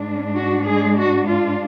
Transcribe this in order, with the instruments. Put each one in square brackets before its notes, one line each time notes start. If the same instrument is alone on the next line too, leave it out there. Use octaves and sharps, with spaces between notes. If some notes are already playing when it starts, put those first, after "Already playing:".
Already playing: [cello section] G#2 G#3 D4
F#4
G#3 G#4
F#4
F4